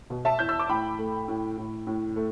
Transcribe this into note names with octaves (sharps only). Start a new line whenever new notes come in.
B2
E5 A5
E2 G6
E6
D6
A2 G5 B5
A3
A2
A2
A2
A3